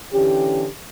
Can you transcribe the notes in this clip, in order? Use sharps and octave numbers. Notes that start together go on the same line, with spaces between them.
D3 E3 C#4 G4